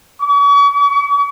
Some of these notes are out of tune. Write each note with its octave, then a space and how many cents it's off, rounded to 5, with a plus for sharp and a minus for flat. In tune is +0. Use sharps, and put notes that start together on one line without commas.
C#6 +45